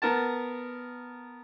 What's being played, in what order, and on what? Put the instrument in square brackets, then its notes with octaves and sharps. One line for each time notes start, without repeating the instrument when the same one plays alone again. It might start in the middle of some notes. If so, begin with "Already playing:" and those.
[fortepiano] B3 A#4 A5